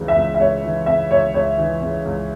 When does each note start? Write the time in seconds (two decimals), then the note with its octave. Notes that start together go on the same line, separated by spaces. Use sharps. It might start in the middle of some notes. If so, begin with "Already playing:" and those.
Already playing: C#2 C#3 E3
0.08 E5
0.17 C#2
0.34 E5
0.40 C#2 C#5
0.63 E3
0.86 C#3 E5
1.11 C#2 C#5
1.34 C#2 C#5
1.58 E3
1.82 C#3
2.05 C#2